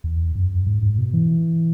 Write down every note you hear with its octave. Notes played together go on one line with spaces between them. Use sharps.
E2
F#2
G#2
G#2
B2
E3